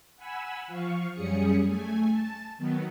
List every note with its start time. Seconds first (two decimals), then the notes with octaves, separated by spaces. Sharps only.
0.17 F#5 G#5 B5 E6
0.68 F3 F5 C#6
1.13 F#2 G3 C#4 G#4 D#6 C#7
1.65 A3 G#5
2.11 A5 A6
2.58 D#3 F#3 B3